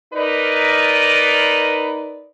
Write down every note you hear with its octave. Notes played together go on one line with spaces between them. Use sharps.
D#4 A#4 B4 D5